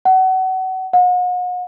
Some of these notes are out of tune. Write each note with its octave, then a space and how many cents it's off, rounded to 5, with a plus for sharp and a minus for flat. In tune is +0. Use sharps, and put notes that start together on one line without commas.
F#5 +30
F#5 -40